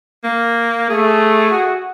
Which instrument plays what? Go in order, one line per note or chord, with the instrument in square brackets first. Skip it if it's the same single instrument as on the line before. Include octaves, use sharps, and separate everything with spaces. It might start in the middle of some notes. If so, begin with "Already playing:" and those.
[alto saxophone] A#3
[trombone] A3 [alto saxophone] G#4
[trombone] F#4